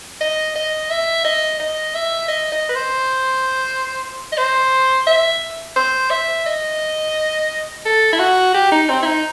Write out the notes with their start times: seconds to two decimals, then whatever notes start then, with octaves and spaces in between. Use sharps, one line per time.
0.21 D#5
0.56 D#5
0.90 E5
1.25 D#5
1.60 D#5
1.94 E5
2.28 D#5
2.52 D#5
2.69 B4
2.75 C5
4.32 D#5
4.38 C5
5.07 E5
5.76 C5
6.11 E5
6.46 D#5
7.85 A4
8.13 E4
8.19 F#4
8.54 G4
8.72 D#4
8.89 C4
9.03 E4
9.06 D#4